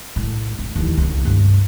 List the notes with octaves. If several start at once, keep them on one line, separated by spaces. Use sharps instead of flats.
A2
D2
D#2 E3
C#2 A#3
G2 A3